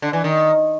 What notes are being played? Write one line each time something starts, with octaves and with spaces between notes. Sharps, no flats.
D3
E3
D#3